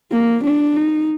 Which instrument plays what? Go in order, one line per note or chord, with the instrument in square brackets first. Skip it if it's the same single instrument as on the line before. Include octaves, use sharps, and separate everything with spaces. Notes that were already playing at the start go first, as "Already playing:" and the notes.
[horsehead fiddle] A#3
D4
D#4